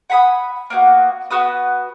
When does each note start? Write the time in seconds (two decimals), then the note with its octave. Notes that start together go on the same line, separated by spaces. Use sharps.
0.10 F#5 G#5 B5 D#6
0.70 A#3 B3 D#4 F#4
1.31 B3 F#4 B4 D#6